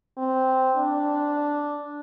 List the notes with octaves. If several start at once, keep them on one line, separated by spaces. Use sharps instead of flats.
C4
D4